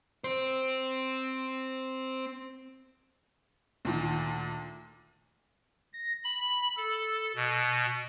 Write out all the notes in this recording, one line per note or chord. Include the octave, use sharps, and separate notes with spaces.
C4 C5
D2 A#2 D#3
A#6
B5
A4
B2